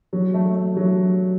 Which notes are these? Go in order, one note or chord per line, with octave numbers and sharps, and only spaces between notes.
F#3
A3
A3
F#3